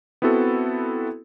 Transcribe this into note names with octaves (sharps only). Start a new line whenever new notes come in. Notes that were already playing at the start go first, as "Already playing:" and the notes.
B3 C4 E4 F#4 A4